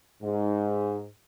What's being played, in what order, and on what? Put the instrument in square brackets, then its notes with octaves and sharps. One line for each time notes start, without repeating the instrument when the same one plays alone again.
[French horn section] G#2